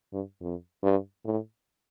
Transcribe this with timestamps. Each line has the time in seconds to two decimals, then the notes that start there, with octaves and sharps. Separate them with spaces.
0.13 G2
0.41 F2
0.83 G2
1.25 A2